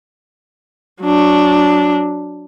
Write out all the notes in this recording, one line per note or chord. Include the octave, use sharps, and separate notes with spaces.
F#3 D4